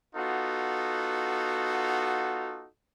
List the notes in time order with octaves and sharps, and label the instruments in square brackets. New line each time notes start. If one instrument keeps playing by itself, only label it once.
[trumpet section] B3 D#4 F4 F#4 A4